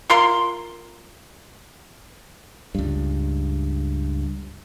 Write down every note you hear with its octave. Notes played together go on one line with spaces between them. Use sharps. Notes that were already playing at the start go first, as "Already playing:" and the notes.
F4 A#4 C6
C#2 G2